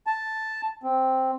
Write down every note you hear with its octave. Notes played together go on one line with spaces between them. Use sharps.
A5
C4